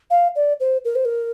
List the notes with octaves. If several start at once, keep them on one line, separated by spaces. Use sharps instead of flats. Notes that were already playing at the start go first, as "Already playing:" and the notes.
F5
D5
C5
A#4
C5
A#4